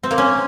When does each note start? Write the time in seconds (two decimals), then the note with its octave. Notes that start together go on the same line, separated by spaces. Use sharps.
0.03 C4
0.11 A#3
0.18 C#4